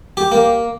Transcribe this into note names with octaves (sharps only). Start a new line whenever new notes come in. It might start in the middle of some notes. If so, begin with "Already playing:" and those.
G4
A#3